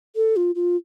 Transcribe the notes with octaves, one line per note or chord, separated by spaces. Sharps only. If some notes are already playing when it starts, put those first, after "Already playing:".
A4
F4
F4